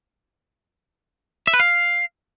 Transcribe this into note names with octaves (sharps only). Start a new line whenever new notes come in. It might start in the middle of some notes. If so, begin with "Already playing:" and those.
E5
B4
F5